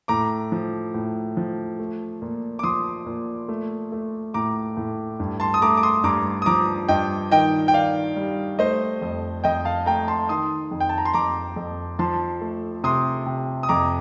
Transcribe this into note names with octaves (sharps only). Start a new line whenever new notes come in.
A2 A#5 D6
F3
A2
F3
A3
A#2
D6
F3 C6 D#6
A#2
A3
A3
A2 A#5 D6
A2
G2
A5 C6
D#6
A3 A#5 D6
D6
C6 D#6
G2 A#5 D6
D#6
F3 A#5 D6
G2 D#5 G5
D#3 D#5 G5
G5
D#3 D5 F5
G3
A3 C5 D#5
F2
F2 D#5 G5
F5 A5
A3 G5 A#5
A5 C6
D#3 C6 D#6
F2
G5
A5
A#5
C6
F2 A#5 D6
F2
F3 A5 C6
A3
C3 C6 D#6
C3
D#6
F2 A#5 D6